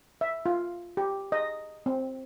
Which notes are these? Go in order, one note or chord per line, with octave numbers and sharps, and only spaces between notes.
E5
F4
G4
D#5
C4